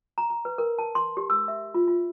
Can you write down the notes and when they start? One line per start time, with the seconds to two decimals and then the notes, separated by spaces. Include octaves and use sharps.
0.18 A#5
0.30 A#5
0.45 B4
0.58 A#4
0.78 A5
0.95 C6
1.17 G4
1.30 E6
1.48 E5
1.74 F4
1.88 F4